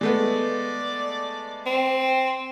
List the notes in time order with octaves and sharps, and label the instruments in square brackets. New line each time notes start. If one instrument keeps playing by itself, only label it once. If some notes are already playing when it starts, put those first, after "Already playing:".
[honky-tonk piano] G#3 A3 B3 [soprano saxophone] D5
[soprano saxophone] C4